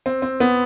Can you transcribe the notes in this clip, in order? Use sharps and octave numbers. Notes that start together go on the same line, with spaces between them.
C4
C4
B3